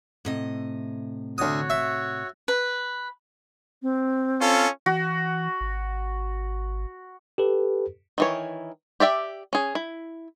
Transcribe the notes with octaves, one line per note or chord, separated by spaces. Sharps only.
A2 C3 D#5
D2 F#4 C#5 D#6
E5
B4
C4
C#4 F4 A4
E3 F#4
G#1
G4 A4 B4
D#3 E3 C#5
G4 D5 E5 G5
C#4 G#4
E4